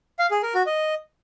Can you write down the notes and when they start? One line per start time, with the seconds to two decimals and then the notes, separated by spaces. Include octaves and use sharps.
0.19 F5
0.31 G#4
0.43 A#4
0.55 F#4
0.66 D#5